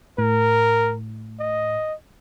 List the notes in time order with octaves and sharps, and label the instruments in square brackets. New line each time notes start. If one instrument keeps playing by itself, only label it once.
[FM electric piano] A2 [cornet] A#4
[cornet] D#5